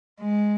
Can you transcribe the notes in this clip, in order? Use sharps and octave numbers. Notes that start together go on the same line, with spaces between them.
G#3